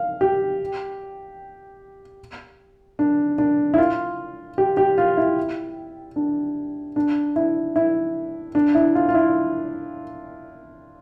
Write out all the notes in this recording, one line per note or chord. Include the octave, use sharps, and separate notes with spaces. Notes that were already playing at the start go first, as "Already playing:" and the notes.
Already playing: F5
G4
D4
D4
E4
F4
G4
G4
F4
E4
D4
D4
E4
E4
D4
E4
F4
F4
E4